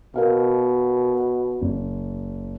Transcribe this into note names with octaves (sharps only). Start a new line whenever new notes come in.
B2 A#4 F5
F#1